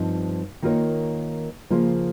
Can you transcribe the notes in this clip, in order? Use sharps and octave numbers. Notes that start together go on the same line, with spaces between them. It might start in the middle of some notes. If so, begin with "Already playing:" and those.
Already playing: G2 F3 C4 D#4
D#3 A#3 F4 A#4 C#5
C#3 F3 A#3 F4 C5